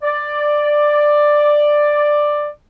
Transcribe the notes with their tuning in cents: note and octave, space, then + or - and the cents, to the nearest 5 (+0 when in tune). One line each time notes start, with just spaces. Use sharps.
D5 +10